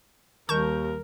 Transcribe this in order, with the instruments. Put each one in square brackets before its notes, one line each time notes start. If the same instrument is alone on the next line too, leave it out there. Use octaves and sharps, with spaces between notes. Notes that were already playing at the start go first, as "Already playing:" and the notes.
[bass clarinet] D#2 [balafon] D#3 G3 [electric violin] A#4 [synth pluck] A5 C#6 G6